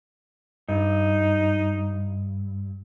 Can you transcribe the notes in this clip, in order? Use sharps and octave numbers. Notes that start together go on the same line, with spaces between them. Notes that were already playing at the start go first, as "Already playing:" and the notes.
G2 D#4